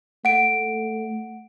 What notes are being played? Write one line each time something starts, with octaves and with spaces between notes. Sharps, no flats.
A3 F#5 D7